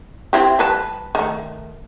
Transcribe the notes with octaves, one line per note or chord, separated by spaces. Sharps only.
C4 E4 G4
G3 B4 A5
D#3 A3